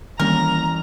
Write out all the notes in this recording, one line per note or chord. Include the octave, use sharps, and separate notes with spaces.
D#3 E3 G3 A#3 C#4 A#4 A#5